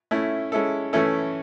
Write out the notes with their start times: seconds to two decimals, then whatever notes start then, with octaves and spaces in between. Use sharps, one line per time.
0.11 A3 C#4 E4
0.52 G#3 C#4 E4 A4
0.93 E3 A3 C#4 E4 A4